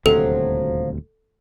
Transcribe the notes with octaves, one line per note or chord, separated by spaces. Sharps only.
D#1 D2 C3 F3 F#3 A4